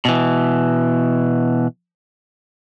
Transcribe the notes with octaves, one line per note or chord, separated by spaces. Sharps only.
B2 E3